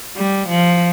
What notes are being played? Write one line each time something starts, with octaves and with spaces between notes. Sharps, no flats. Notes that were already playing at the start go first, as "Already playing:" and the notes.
G3
F3